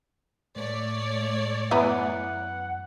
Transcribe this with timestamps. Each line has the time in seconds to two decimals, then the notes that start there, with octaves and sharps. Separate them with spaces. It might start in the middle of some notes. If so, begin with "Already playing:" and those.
0.56 A2 A3 C#5 D5
1.71 F#2 E3 B3 F#5 A#5